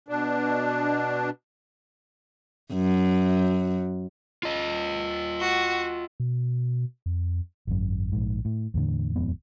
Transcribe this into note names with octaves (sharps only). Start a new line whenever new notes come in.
B2 D4
F#2
F4 D#5
F#4
B2
F2
G#1 F#2
A#1 G#2
A2
E2 A2 D3
D#1 F2 G#2 B3